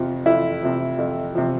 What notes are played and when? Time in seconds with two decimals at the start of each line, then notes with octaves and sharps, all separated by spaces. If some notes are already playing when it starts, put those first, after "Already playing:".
Already playing: F2 C3 F3
0.26 F2 E4
0.63 C3 F3
0.98 F2
1.35 C3 F3